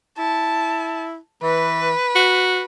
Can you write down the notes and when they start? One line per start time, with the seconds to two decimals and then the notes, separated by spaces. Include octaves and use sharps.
0.18 E4 A5
1.43 E3 B4
2.15 F#4